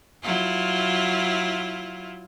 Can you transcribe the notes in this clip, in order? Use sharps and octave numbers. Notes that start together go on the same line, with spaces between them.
F#3 E4 F4